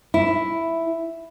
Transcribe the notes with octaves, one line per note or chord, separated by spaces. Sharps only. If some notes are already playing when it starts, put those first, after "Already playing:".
E4